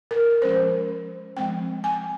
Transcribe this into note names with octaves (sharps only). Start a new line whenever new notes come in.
A#4
F3 G#3 C#4 C5
F3 G#3 C4 G5
G#5